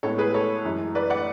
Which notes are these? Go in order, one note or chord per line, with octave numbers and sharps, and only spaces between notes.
A2 G#3 B3 A4 C#5
G#4 B4
A4 C#5
F#2 E3 G#3
B4 D5
D5 F#5